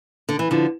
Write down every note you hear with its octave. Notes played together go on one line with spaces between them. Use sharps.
D3
E3
D3 F3